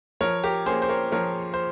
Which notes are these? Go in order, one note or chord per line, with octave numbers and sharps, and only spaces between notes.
F3 A#4 C#5
G4 A#4
A#3 C#4 G#4 C5
C5
A#4 C#5
F3 A#4 C#5
C5